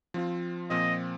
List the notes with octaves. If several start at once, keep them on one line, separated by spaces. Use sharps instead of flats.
F3 C4 F4
A#2 F3 C4 D#5